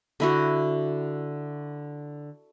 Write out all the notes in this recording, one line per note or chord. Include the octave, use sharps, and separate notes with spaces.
D3 E4 F#4